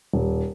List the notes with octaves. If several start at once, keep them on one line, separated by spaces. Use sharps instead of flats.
D#1